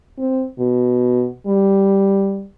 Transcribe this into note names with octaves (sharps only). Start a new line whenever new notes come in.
C4
B2
G3